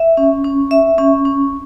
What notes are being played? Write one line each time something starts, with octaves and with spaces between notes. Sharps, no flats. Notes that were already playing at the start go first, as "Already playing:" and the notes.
Already playing: E5
C#4
C#4
E5
C#4
C#4